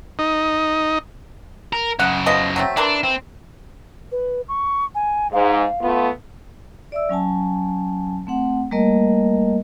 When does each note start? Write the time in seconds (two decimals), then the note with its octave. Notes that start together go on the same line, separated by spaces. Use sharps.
0.19 D#4
1.73 A#4
1.99 F#2 C#3 F#5
2.26 F3 B3 D#5
2.56 F#3 A3 C4
2.77 E3 D4 A#4 C6
3.03 C4
4.12 B4
4.48 C#6
4.95 G#5
5.33 G#2 F5
5.81 A3 B3 F4
6.92 D5 E5 E6
7.09 F#3 C#4 G#5 A5
8.27 A3 C4 F#5
8.71 G3 A3 A#3 A#4 D#5